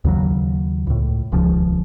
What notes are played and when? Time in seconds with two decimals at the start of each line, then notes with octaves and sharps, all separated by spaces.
0.05 D#2 C#3 F#3
0.87 C#2 A2
1.32 D#1 C#2 C#3 F3